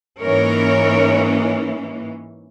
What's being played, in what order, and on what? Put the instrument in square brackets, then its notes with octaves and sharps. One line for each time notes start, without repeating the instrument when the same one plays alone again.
[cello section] G#2 E3 A#3 C#4 A#4 C#5